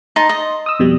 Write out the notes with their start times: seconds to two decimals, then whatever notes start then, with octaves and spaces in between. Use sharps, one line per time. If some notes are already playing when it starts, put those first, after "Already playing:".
0.16 D#4 A5 C6
0.29 D#5
0.66 D#6 E6
0.79 F2 B2 G3